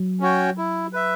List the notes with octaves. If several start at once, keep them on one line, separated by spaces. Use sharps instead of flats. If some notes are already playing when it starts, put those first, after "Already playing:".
Already playing: F#3
C#4 F#4 C#5 G5
E4
B4 E5